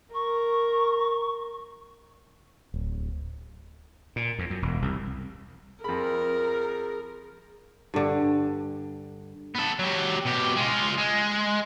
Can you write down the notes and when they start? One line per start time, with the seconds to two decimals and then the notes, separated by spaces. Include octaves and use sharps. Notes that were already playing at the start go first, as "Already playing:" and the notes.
0.14 A#4 C#6
2.74 D1
4.16 A#2
4.39 F2
4.50 F#2
4.62 E1
4.82 C2
5.84 F2 G#4 A#4 B5
7.94 G2 D3
9.55 B3 A4
9.79 F#3 G4
10.26 B2 G4
10.56 G#3 F4
10.98 G#3